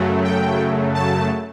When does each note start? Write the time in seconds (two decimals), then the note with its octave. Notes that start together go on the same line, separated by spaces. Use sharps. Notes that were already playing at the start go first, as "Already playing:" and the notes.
Already playing: F#2 C#3 F#3 A3
0.24 G5
0.95 A5